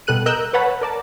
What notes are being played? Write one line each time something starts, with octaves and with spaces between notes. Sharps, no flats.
B2 G3 A4 F#6 D#7
A#4 D#5 E6 F#6 G6
B4 C#5 F#5 A5 B5
A#4 D5 A5